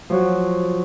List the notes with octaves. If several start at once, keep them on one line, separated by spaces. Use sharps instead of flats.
F3 F#3 F#4